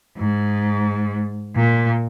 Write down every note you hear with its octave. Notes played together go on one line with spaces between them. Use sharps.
G#2
A#2